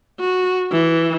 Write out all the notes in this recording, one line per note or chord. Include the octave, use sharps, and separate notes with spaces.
F#4
E3